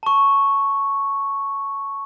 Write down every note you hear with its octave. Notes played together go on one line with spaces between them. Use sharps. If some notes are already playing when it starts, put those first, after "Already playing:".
A5 C#6